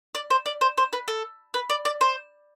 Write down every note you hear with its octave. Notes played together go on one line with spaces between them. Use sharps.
D5
C5
D5
C5
C5
B4
A4
B4
D5
D5
C5